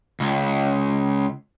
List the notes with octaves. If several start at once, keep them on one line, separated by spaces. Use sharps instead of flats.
C#2